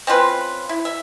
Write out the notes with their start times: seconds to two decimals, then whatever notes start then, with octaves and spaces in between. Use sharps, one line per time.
0.07 C4 C#4 F4 B4
0.69 E4
0.85 E5